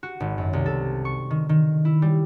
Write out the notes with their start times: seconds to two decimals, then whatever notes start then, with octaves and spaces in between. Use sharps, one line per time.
0.03 F#4
0.20 G#1
0.38 F#2
0.53 C2
0.66 A4
1.05 C#6
1.30 D#3
1.49 D#3
1.85 E4
2.02 G3